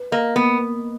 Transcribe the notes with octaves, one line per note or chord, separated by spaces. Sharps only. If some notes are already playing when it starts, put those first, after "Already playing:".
Already playing: B4
A#3 D#5
A#3 B3